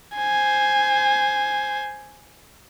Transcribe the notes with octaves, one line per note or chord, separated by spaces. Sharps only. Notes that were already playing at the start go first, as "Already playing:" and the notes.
C5 G#5